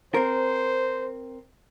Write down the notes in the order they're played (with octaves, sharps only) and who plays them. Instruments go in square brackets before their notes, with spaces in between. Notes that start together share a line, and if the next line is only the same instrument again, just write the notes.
[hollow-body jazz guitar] C4 A#4 [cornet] C5